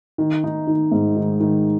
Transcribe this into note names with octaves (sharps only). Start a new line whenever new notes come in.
D#3
D#4
D#3
G#2
D#3
D#3